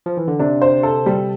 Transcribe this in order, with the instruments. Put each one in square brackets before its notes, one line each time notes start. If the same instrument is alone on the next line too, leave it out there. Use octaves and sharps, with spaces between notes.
[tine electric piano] F3
E3
D3
[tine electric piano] C3 [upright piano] D4
[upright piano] C5
A4
G3